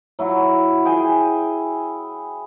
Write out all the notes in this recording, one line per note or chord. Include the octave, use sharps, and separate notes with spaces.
F#3 E4 F#4
G#4 G5 G#5